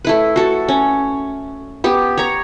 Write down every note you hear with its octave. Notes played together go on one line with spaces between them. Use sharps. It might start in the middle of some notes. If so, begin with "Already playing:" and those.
A3 E4 B4
F#4 A4
C#4
B3 G4
C#5 A#5